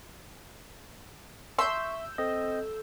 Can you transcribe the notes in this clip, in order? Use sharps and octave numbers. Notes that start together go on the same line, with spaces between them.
E5 C6 C#6 E6 G6
C4 A4 D#5